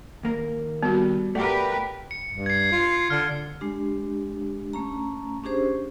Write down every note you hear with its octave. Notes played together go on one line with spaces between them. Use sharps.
D#2 A#3 A#4
G3 B3 F#4
A3 G4 A#4 B4 D5 F#5 G5
C#7
G2
G#6 C7
F4
D3 F6
G#3 D4 G4
A3 C#4 A#5
C#4 D4 G4 G#4 C5